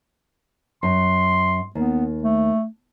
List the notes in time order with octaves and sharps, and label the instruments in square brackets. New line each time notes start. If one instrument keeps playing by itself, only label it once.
[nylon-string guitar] F#2 [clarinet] C6
[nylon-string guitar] D#2 [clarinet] B3
[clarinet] A3